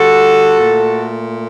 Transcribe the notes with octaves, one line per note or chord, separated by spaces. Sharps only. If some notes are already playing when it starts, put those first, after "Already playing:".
Already playing: D3 G3 F#4 A4
A#2 A3